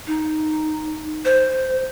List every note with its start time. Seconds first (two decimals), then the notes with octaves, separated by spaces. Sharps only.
0.07 D#4
1.25 C5